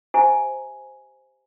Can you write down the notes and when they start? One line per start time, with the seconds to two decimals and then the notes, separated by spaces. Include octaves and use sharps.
0.14 G4 C5 E5 G#5 A#5